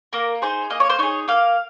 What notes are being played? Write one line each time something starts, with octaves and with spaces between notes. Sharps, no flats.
A#3 A#4
D#4 G#4 C5
A#3 D#5
C#5
C5
D#4 G#4 C#5
A#3 F5